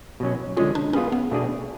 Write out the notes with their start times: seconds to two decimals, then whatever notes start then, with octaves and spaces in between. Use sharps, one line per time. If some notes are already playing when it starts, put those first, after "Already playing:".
0.20 B2 F#3 C#4
0.57 D3 G#3 C#4 F4 G#4
0.75 D4
0.93 B3 C#4 F4 G#4 B4
1.12 B3
1.31 B2 A3 D4 G#4 D5